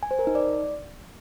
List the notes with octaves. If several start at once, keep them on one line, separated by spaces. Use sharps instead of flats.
G#5
C5
A#4
D#4
D5